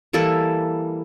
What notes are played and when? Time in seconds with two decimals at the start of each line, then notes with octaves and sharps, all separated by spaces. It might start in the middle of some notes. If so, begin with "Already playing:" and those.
0.13 E3 G3 A#3 A4